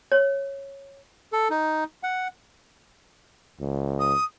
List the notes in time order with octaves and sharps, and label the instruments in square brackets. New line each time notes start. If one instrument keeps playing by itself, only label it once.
[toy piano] C#5
[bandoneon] A4
D#4
F#5
[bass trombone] C#2
[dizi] D#6